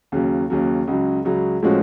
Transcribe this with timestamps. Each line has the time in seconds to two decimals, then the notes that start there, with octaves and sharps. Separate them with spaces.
0.12 D#2 C#3 F#3
0.50 D#2 C#3 F#3
0.87 C#2 C#3 F#3
1.25 C#2 C#3 F#3
1.63 A2 F3 G#3 C#4 F#4